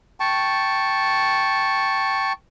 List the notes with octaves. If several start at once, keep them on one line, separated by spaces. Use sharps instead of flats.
G5 A5 C#6